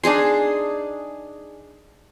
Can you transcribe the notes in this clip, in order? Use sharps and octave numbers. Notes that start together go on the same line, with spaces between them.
D4 D#4 G#4 C6